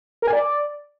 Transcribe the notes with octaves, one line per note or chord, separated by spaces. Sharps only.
A#4
G#5
D5